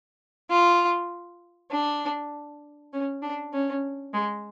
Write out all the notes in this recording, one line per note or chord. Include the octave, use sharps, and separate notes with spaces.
F4
D4
C#4
D4
C#4
G#3